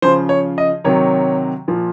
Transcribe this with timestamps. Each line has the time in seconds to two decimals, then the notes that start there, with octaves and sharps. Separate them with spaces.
0.02 C#3 F3 C5
0.29 C#5
0.58 D#5
0.84 C3 D#3 F#3 C#5
1.68 A#2 F3